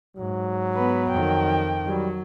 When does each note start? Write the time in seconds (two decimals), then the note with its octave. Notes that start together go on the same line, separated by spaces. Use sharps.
0.17 G#2 F#3
0.75 B3 B4
1.11 F2 D#3 G5
1.87 F#3 G3